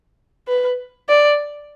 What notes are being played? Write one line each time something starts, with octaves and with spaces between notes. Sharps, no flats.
B4
D5